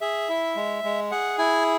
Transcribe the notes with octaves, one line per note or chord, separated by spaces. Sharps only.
G#4 E5
E4
G#3
G#3
G#4 F#5
E4 G#5